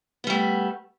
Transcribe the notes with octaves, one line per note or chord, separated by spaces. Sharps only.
G3 A3 B3